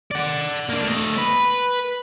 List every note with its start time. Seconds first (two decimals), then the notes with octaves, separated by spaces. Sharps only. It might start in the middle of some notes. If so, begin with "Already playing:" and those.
0.11 D5 F#5
0.69 A#3 D4
0.84 A3 D#5
1.18 B4